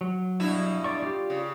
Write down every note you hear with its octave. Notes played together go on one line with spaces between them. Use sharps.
F#3
G2 B2 E4
D5 C#6
F4 G4 D5
C#3